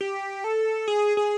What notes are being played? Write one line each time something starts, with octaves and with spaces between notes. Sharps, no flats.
G4
A4
G#4
G#4